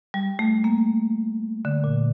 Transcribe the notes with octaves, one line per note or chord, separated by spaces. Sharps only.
G3
A3
A#3
D3
A#2